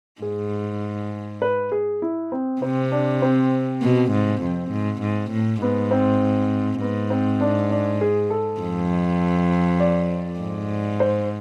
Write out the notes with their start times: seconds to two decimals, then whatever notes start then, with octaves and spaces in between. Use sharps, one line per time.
0.22 G#2 G#4
1.42 B4
1.72 G#4
2.02 E4
2.32 C4
2.62 C3 C4
2.92 D4
3.22 C4
3.82 B2
4.11 G#2
4.42 F2
4.71 G#2
5.01 G#2
5.31 A2
5.61 G#2 B3
5.91 C4
6.81 G#2 B3
7.10 C4
7.41 D4
7.71 D4
8.01 G#4
8.30 A4
8.60 F2
9.80 D5
10.40 G#2
11.00 C5